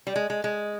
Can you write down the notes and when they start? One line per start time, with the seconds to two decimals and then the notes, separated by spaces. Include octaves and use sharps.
0.07 G3
0.16 G#3
0.30 G#3
0.44 G#3